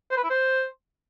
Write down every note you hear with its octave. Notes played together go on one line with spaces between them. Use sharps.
C5
B4
E4
C5